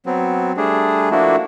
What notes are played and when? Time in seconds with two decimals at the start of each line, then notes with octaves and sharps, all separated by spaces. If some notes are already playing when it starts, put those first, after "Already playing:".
0.06 F#3 B3 C4
0.57 G3 A3 D4 G#4
1.11 F3 A3 A#3 D4 E4 F#4